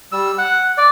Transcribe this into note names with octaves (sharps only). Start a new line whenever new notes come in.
G3 E6
F#5
D5